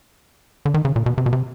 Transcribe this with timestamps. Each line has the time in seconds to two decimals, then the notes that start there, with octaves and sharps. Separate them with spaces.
0.65 D3
0.74 D#3
0.85 C#3
0.96 A#2
1.06 B2
1.18 C3
1.26 B2
1.33 C3